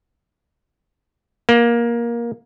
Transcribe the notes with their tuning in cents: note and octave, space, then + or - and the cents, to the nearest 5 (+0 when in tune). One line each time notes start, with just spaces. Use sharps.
A#3 +15